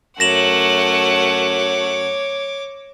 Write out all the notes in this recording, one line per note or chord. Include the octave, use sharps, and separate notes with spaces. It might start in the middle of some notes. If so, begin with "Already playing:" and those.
F#2 A3 C#5 F#5 D6 A#6 E7 F#7